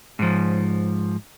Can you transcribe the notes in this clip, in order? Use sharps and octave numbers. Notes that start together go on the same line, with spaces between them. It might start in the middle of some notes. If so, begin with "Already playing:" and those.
G#2 F3